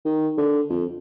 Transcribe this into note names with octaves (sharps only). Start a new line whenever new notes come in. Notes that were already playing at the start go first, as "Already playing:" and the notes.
D#3
D3
F2